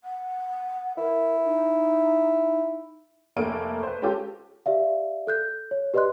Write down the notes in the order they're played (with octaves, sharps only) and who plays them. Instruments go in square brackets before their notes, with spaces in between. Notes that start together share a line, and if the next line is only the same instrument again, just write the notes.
[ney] F#5
[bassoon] E4 [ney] A#4
[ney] D#4
[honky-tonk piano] F1 A3 A#3 A#4 D7
B4 C5
G#3 C#4 F4 G4 A4
[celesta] G4 D5 E5 F5
A4 F#6 G6
C#5
G4 B4 D5 D#5 C6 F#6